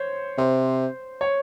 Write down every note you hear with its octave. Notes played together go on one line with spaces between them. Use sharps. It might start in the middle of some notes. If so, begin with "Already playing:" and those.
Already playing: C5 C#5
C3 C5
C#5